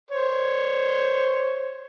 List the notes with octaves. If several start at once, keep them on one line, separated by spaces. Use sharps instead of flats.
C5 C#5